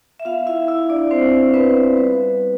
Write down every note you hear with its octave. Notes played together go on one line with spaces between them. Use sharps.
E5
B3 F4 F5
E4 E5
E4 E5
D4 D5
C4 C5
B3 B4
G3 B3 B4